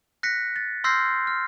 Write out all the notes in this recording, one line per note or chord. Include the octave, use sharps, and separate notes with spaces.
F#6 A#6 B6 C#7
A6
C6 E6 F6 G6 A#6 C7
F6